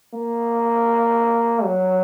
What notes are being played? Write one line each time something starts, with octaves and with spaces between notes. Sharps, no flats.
A#3
F#3